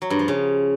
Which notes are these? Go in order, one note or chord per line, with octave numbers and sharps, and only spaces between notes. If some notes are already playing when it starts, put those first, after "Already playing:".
F#3
G2
F3
C#3